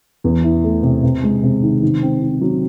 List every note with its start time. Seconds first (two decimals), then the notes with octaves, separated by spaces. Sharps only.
0.24 E2
0.43 E3
0.64 A3
0.83 C3
1.03 C3
1.23 G#3
1.43 C3
1.62 D#3
1.82 D#3
2.03 C4
2.22 D#3
2.41 F#3